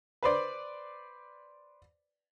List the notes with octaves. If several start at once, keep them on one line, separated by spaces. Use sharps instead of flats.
B4 C5 D5